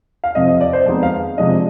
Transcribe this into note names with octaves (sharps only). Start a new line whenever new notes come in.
F5
F2 C3 F3 D#5
D#5
D5
C5
F2 D#3 G#3 B3 D#4
F5
C3 F3 G#3 D4 D#5